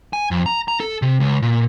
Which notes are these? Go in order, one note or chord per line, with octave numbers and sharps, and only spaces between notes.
G#5
F2
A#5
A#5
A4
C3
C#2
A#2